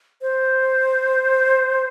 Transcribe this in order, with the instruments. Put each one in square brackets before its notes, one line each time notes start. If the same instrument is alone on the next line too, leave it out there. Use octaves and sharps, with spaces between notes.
[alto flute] C5